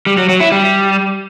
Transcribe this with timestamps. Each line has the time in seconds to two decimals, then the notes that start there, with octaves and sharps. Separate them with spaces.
0.06 G3
0.18 F#3
0.29 F#3
0.40 E4
0.52 G3